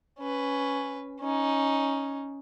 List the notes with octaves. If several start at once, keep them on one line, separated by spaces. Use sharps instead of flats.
C#4 B4
C#4 D#4